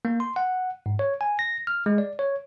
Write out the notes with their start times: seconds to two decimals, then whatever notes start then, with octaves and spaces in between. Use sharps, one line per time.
0.05 A#3
0.20 C6
0.36 F#5
0.86 G#2
0.99 C#5
1.21 G#5
1.39 A#6
1.67 F6
1.86 G#3
1.98 D5
2.19 C#5